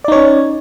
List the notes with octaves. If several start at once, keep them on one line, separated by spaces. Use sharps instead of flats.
C#4 D#4 C#5 D5